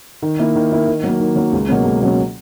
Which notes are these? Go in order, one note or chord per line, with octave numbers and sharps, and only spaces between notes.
D#3
A#3 E4
D#3
A#3 E4
D#3
F#3 A#3
D#3
F#3 A#3
C#2
B2 F#3 A#3 C#4
C#2
B2 F#3 A#3 C#4